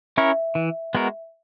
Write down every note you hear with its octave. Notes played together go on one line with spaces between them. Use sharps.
C#4 E4 A#4 C#5 E5
E3
G#3 B3 F#4 A#4